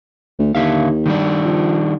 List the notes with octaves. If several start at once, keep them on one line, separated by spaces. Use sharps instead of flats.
D2
D#2 D3 E5 F5
D#3 G3 D4
F3